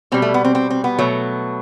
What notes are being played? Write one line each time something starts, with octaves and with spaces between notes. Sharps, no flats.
B2 G3 C4
A3
B3
C4
C4
C4
B3
B2 F#3 A3